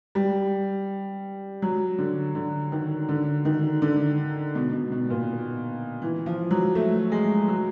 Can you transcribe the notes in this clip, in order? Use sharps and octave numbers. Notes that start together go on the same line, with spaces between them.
G3
F#3
D3
D3
D#3
D3
D#3
D3
B2
B2
B2
A#2
E3
F3
F#3
A3
G#3
F#3